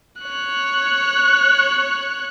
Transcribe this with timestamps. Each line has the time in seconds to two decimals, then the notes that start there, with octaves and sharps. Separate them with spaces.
0.22 C#5 F#6